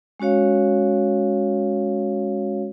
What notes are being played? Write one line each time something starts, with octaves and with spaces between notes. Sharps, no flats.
G#3 C#4 F#4 C#5 F5